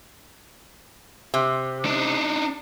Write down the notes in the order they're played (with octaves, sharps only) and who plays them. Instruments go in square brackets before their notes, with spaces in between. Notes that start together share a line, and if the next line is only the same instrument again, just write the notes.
[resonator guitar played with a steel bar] C3
[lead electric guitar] D4 D#4